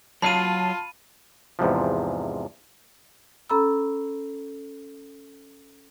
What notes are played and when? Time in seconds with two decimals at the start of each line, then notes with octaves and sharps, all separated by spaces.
0.22 F#3 F4 C#5 F5 A5 B5 D#7
1.59 E2 G#2 C3 F3
3.50 C#4 A4 A#5 B5 E6